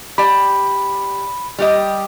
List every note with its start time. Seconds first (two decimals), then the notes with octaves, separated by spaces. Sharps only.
0.18 G4 D5 A5 B5
1.59 G3 G4 D#5